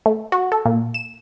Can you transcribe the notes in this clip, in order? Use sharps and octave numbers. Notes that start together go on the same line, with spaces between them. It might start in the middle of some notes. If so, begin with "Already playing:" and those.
A3
F#4
A4
A#2
E7